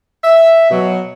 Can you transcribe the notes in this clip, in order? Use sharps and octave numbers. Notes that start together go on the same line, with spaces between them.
E5
B2 F#3